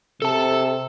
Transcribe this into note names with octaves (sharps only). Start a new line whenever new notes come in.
C3 A4 A5